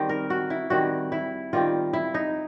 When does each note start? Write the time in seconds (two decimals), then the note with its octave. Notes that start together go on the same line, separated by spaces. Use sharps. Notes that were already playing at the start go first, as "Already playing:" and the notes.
Already playing: D#3 G3 C4
0.09 A#4
0.30 F#4
0.50 E4
0.70 D#3 G3 C4 F#4
1.12 E4
1.53 D#3 G3 C4 F4
1.93 E4
2.14 D#4